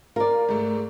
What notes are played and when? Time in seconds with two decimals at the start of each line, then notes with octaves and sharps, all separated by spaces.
0.16 F4 A#4 D5
0.49 G#2 A3